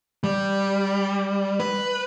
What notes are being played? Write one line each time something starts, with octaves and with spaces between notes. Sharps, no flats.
G3
B4